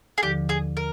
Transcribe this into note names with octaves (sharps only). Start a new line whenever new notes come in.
G#4
D#2 D3 F3 G4
G#4
A#4